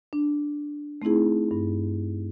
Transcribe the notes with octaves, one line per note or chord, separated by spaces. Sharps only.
D4
A3 C4 D#4 E4 G#4
G2